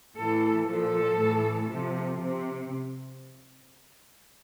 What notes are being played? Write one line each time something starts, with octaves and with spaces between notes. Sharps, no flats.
A2 E3 A4
A#2 F3 A4
A2 E3
C3 F3
C3